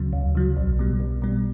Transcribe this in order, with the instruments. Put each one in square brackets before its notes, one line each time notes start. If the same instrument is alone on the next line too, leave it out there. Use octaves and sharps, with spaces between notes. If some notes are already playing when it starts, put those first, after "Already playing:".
Already playing: [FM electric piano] D2 C#3 F#3
D2
C#3 F#3
B1
B2 G3
B1
B2 G3